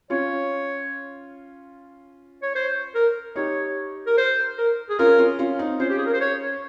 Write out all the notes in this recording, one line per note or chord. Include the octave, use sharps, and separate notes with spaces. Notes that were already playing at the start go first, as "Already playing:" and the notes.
C#4 F4 C#5
C#5
C5
A#4
D#4 G4 C#5
A#4
C5
A#4
G#4
C#4 F4 A#4
C#4 F4
C#4 F4
C4 D#4
C#4 F4 C5
G4
G#4
A#4
C5
C#5